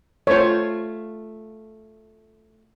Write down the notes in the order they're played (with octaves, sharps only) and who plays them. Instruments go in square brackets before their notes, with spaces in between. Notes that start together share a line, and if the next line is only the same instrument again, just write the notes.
[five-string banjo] A3 F4 [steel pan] C5 C#5